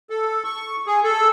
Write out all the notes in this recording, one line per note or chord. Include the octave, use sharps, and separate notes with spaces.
A4
C#6
G#4
A4